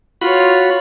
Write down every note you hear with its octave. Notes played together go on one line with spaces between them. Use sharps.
F4 F#4 C#5 B5